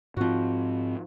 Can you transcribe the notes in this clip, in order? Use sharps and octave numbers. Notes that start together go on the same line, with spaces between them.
G#2 F3 C4 F#4